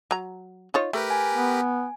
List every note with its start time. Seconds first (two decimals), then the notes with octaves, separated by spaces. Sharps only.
0.11 F#3 A#5
0.74 D#4 F4 C#5
0.93 A3 G4 A#4 B4
1.10 G#5
1.35 B3